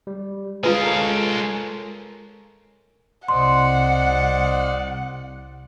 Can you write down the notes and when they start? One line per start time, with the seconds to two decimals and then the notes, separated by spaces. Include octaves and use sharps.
0.07 G3
0.64 G#3 F4 G#4 B4 F5 A#5 D#6
0.83 A4 A#4 C#5
3.28 C2 C5 D5 D#5 F#5 C6